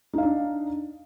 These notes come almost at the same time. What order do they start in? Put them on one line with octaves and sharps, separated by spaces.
D#4 F5 D4